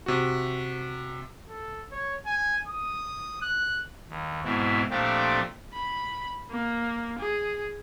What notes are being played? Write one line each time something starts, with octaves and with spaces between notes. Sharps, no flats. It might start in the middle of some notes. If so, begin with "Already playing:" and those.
C3 F#4
A4
C#5
G#5
D#6
F#6
D#2
G#2 B2 C4 E4
A#2 F3 A3 C4 D4 G4
B5
A#3
G#4